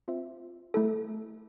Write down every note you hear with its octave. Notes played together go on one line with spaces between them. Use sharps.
C4 F4 C5 E5
A3 E4 A4